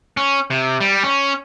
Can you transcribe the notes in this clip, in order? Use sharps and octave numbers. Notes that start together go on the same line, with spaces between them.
C#4
C3
G3
C#4